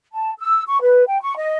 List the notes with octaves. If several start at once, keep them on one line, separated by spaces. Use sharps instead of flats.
A5
E6
C#6
B4
G5
C#6
D#5